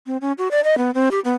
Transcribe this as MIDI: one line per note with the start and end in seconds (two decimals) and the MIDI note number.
0.06 0.17 60
0.21 0.32 61
0.38 0.48 66
0.51 0.60 74
0.64 0.78 75
0.78 0.91 59
0.94 1.09 60
1.11 1.20 67
1.25 1.34 59